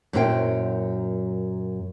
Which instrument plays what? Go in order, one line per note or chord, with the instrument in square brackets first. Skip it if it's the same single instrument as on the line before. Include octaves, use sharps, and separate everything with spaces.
[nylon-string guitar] F#2 A#2 F#3 E4 C5 G5